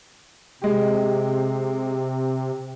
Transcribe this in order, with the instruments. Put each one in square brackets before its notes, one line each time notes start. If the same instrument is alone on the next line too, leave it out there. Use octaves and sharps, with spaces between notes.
[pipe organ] C3 [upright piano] G#3 G4